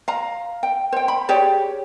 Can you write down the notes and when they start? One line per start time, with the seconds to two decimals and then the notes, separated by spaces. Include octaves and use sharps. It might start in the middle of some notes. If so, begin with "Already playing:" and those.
0.08 F5 A#5
0.63 G5
0.92 C5 G5
1.08 B5
1.29 G4 G#4 C#5 D5